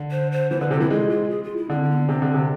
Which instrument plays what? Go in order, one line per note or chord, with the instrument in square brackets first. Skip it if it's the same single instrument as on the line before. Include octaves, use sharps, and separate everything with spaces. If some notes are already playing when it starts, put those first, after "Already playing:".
Already playing: [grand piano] D3
[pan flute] C5
C5
[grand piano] E3 [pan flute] C5
[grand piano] D3 [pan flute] B4
[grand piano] C3 [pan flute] A4
[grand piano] E3 [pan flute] E4
[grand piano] G#3 [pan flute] F4
[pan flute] F4
G#4
F4
E4
[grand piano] D3 [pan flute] C4
[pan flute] C4
B3
[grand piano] C3 [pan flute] C4
[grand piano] D3
C3